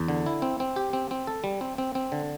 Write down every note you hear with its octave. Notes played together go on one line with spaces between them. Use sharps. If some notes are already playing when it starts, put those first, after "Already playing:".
Already playing: E2
D3
E4
C4
C4
G4
C4
C4
A4
G3
C4
C4
C4
D3